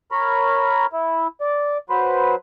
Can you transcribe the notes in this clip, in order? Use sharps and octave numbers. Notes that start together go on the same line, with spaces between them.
A#4 C#5 A#5 B5
E4
D5
F#3 B4 C5